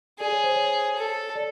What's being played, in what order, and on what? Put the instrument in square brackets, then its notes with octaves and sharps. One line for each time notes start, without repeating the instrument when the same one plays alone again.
[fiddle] G#4 [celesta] D5
[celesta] C#5
C5
C#5
[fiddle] A4
[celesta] D5